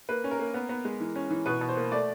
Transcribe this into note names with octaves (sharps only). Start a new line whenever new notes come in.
A#3 B4
C#4
A#4
A#3
B3
B3
G#3
E3
C#4
E3
B2 B4
B2
C5
A#3
A3 D5